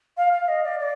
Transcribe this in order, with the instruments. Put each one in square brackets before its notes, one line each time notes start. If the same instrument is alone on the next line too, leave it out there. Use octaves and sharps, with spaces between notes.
[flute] F5
F5
D#5
D5
D5